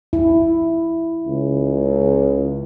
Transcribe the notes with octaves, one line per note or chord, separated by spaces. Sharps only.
E4
C#2